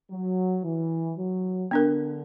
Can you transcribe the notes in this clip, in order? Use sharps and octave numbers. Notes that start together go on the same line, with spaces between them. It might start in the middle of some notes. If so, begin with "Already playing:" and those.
F#3
E3
F#3
D3 B3 D4 A#4